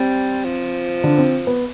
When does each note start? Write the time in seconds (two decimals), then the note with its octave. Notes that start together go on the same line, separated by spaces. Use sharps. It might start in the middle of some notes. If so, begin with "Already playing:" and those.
Already playing: G3 C4
0.44 F3
1.04 D3 D4
1.18 C4
1.47 B3